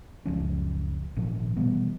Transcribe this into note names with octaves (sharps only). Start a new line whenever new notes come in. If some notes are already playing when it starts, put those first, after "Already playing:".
F#1 C#2 F3 C#4
G#1 A#2 F3
B2 E3 G3 B3